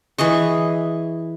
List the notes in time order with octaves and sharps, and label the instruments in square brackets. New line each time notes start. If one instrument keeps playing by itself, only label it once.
[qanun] E3 G#4 D#5 C#6